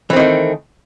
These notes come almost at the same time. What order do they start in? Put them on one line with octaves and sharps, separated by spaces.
E3 C4 D#3 A3